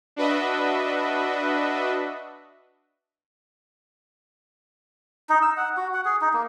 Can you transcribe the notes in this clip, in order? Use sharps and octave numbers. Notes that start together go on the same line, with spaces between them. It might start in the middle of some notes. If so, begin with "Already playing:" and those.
D4 F#4 B4 D#5 E5
D#4
E6
F#5
F#4
F#5
G#4
D#4
A#3